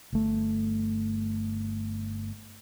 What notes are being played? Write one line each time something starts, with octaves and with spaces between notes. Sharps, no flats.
G1 A3